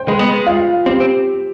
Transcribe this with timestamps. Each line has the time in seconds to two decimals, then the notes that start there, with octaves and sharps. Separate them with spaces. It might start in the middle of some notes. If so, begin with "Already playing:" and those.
Already playing: C5 G5
0.08 G#3 B4
0.19 B3
0.30 G#3
0.47 F4
0.86 C4 G4
1.00 C4